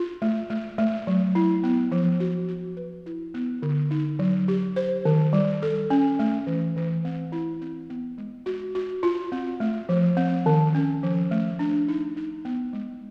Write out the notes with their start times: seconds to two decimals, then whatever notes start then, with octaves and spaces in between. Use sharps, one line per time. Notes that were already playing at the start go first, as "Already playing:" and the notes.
Already playing: F4
0.22 A3
0.50 A3
0.78 A3
1.07 F#3
1.35 E4
1.64 B3
1.92 F3
2.20 F#4
2.48 F#4
2.77 B4
3.06 E4
3.34 B3
3.62 D3
3.91 D#4
4.19 F#3
4.48 G4
4.76 C5
5.05 D#3
5.33 G3
5.62 A4
5.90 C#4
6.19 A3
6.47 E3
6.76 E3
7.05 C4
7.32 E4
7.61 C4
7.90 B3
8.18 G#3
8.46 F#4
8.75 F#4
9.03 F4
9.32 C4
9.60 A3
9.89 F3
10.17 C4
10.46 D#3
10.75 C#4
11.03 F3
11.31 A3
11.59 D4
11.88 D#4
12.16 D#4
12.45 B3
12.73 G#3